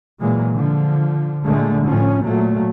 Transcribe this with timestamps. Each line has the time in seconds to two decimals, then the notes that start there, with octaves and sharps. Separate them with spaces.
0.20 A#2 E3 F#3 G#3 A#3
0.54 D3 F3
1.44 A#2 D3 G#3 A3
1.86 A2 F3 C#4
2.23 A#2 F#3 A3